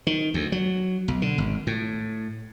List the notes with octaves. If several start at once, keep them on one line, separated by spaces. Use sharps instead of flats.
D#3
D2
F#3
B1
D3
G#1
A2